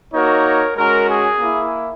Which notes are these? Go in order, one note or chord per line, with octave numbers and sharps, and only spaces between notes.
A#3 D#4 F#4 A#4 C#5
G#3 C#4 F#4 A#4
G#4
A#3 E4